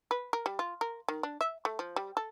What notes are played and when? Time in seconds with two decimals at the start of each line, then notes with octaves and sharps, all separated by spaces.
0.11 B4
0.33 A#4
0.46 G3
0.59 F4
0.81 A#4
1.08 D#3
1.23 D4
1.41 E5
1.65 A3
1.79 F3
1.96 G3
2.17 A4